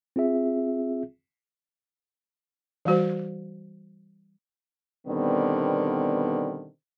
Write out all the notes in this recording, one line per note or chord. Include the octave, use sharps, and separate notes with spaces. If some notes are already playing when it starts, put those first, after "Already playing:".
C4 F4 G#4 E5
E3 G3 F#4 C5
B2 D3 D#3 G3 B3 C4